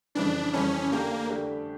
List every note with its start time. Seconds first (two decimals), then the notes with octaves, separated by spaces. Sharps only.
0.15 F2 C#3 E3 G3 D4
0.53 F2 C#3 E3 G3 C#4
0.92 D3 A3 A#3 D4 G4
1.30 D3 A3 D4 G4